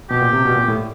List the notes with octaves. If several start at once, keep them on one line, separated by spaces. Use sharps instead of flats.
B2 G4
A#2
C3
B2
A#2
A2